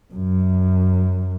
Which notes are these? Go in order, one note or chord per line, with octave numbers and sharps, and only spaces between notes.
F#2